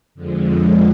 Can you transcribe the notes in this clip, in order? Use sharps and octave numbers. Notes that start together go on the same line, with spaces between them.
F2 D3 F3 G#3